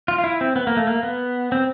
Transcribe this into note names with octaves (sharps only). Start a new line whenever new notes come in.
F4
F4
E4
C4
B3
A#3
A3
A#3
B3
C4